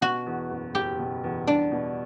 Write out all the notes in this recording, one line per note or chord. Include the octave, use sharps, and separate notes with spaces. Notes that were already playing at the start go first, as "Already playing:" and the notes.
B2 F#4
E2
F#1
F#1 G4
B2
E2
G3 D4
B2